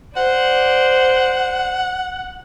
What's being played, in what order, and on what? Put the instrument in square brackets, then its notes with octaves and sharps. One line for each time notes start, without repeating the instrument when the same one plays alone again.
[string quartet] C5 D5 [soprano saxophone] F#5